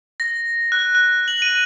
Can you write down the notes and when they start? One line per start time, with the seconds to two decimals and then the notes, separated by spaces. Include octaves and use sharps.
0.20 A#6
0.72 F#6
0.95 F#6
1.28 F#7
1.42 D#7